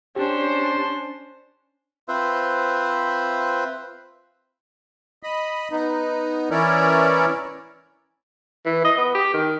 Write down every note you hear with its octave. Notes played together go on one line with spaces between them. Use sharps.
C#4 D4 G4 C5
C4 F4 B4 C5 E5
D#5 B5
B3 D#4
E3 C#4 E4 A#4 C#5 D5
E3
D#5
B3
G4
D#3